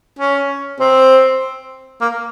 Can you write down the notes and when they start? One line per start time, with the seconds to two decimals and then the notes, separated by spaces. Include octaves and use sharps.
0.19 C#4
0.80 C4
2.01 A#3